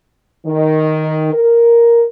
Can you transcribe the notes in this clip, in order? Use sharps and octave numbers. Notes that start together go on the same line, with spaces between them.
D#3
A#4